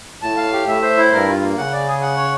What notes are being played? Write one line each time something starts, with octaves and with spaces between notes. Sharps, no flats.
A2 A5
F5
G4
A2 E5
C5
E4
G2 A#4
F4
A#3
C#3 F#5
D5
G#4
F#5
C#5